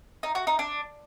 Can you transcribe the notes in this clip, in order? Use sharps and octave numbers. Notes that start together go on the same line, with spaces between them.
D#4
F#4
D#4
D4